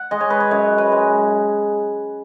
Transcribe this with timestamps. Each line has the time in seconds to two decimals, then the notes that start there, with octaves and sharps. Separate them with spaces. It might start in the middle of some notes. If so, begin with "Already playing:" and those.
Already playing: F#5
0.11 G#3 D#5
0.21 C#5
0.30 B4
0.40 C#5
0.51 F#2 C#5
0.78 B4
0.92 G#3